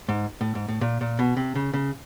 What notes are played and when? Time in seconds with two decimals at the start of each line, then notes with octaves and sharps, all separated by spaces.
0.09 G#2
0.41 A2
0.55 G#2
0.68 A2
0.81 A#2
1.01 A#2
1.19 B2
1.37 C3
1.55 C#3
1.74 C#3